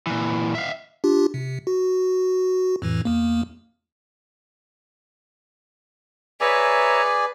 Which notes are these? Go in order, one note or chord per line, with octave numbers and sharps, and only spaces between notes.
A#2 E3
E5 F5
D4 F4 G4
C3
F#4
F2 A2 E3
E2 A#3
G#4 B4 C#5 D5 E5 G#5 A#5